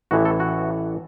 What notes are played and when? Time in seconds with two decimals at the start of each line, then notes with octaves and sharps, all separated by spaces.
0.11 A1 A2 E3 F#4
0.25 A4
0.40 F#4